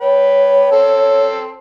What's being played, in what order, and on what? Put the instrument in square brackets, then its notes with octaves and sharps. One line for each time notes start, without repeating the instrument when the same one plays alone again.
[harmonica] B4 G5 [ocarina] C#5
[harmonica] C4 A4